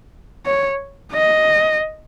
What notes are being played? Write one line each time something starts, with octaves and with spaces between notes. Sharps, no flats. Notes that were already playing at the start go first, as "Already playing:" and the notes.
C#5
D#5